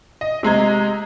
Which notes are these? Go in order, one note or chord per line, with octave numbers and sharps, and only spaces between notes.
D#5
C3 G#3 A#5 G#6